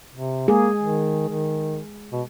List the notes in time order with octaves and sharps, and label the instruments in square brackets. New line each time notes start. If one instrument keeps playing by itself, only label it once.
[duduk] C3
[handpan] G#3 G#4 [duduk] A#3
[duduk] D#3
D#3
B2